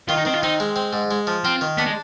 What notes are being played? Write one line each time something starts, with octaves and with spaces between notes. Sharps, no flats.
D#3 F4
D#4
D#3 C4
F4
C4 D#4
G#3
C4
G#2
G#3
F3
C4 F4
D#3
B3 D4
G#3